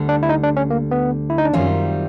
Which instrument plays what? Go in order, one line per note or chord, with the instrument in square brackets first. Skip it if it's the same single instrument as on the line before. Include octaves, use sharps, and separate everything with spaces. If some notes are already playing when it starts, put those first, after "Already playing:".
Already playing: [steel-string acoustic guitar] D2 D3 G3
[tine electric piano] D4
E4
D#4
D4
C#4
A#3
B3
E4
D#4
D4
[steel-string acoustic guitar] F#2 D#3 G3 C4 F4 [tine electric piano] C#4